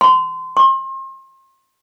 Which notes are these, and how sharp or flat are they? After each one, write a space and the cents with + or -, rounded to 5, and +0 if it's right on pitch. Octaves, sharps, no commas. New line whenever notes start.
C6 -25
C6 +35